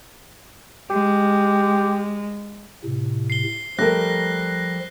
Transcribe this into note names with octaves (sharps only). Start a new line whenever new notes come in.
G#3 G4
A2 C3
C7 G7
F3 G3 A3 A#4 F#6 A#6